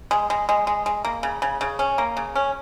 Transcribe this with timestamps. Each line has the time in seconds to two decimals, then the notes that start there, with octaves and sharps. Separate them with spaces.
0.11 G#3
0.30 G#3
0.49 G#3
0.67 G#3
0.86 G#3
1.05 A#3
1.23 C#3
1.42 C#3
1.61 C#3
1.79 C#4
1.98 A#3
2.17 C#3
2.36 C#4